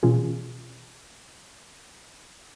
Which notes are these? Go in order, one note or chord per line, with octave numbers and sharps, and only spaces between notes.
B2 E3 C#4 F4 G#4